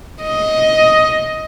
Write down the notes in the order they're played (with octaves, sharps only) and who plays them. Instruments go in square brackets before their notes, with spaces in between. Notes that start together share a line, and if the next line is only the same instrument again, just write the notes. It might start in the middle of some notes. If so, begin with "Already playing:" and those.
[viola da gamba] D#5